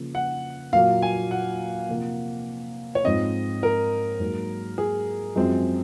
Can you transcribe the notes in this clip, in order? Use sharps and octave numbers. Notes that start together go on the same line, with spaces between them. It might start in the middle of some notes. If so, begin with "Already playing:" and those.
Already playing: C#3 F3 A#3
F#5
A#2 F#3 A#3 F5
G#5
F#5
C3 F3 A#3
C#5
G#2 F3 C4 D#5
A#4
G#2 F#3 A#3
G#4
F#2 F3 G#3 C4